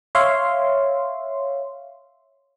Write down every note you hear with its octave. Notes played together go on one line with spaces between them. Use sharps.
C#5 E5 F5 C6